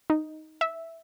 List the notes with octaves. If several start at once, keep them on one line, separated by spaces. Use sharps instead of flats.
D#4
E5